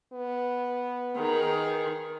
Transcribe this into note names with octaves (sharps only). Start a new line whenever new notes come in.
B3
D#3 G#4